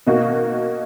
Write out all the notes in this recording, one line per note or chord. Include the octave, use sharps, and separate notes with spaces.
B2 A#3 D#4 F#4